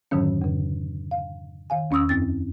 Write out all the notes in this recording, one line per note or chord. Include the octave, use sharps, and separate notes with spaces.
F2 G#2 D3 D#3 F#3 C#4
F2 C#3
F5
D#3 F5 G#5
E2 C#4 C#6 D#6 E6
F#2 C4 A6